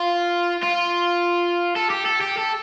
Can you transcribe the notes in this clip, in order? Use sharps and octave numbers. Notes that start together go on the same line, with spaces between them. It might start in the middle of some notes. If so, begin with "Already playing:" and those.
Already playing: F4
F4
A4
G4
A4
G4
A4